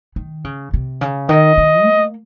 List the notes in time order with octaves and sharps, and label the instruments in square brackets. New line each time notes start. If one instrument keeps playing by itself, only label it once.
[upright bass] D#3
C#3
C3
C#3
[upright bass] D#3 [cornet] D#5
[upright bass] D#3
A#3